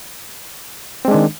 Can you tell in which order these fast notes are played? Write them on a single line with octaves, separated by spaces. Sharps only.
C4 G#3 D4 D#3